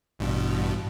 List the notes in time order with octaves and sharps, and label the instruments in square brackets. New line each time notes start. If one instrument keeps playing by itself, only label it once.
[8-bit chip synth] A1 G2 B2